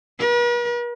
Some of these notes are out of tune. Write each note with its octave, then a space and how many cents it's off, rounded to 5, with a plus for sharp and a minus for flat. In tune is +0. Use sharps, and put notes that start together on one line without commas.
B4 -45